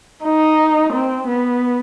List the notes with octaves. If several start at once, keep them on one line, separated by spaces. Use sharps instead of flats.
D#4
C4
B3